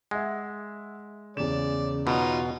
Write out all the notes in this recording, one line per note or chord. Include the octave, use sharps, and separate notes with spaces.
G#3 E5 F#5
E2 C#3 D5 E7
B2 D#4 F4